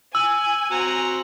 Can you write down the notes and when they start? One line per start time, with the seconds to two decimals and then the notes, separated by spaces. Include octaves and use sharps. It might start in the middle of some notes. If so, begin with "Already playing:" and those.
0.15 G#5 E6
0.71 C4 F#4 A#5